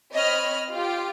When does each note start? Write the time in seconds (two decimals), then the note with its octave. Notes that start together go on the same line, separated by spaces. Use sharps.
0.13 C4 C#5 D#5 B5 F6
0.72 F4 G4 G5